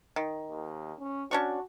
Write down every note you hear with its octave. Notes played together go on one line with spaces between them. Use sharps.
D#3
D#2
C#4
C#4 D4 F#4 C#6